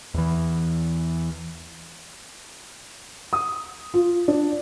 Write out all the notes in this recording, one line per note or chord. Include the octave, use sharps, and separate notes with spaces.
E2 E3
D#6
F4
D4